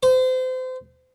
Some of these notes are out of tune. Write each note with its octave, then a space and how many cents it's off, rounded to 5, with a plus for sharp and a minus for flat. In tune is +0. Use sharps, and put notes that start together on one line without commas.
C5 -30